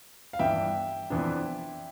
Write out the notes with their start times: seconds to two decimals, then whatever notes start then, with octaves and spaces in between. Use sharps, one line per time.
0.33 F5
0.39 G2 E3 B3 D4 E5 G5
1.10 F2 E3 B3 D4